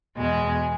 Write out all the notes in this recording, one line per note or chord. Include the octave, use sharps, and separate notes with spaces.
E2 B2 G#3 G#4